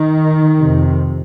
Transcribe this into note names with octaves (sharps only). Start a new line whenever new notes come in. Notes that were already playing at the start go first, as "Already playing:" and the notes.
Already playing: D#3
F2 C3